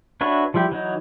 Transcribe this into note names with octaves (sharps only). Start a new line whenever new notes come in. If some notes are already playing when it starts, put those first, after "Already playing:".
D4 F#4 B4 C#5 E5
F3 G3 E4 G4
E3 F#3 D#4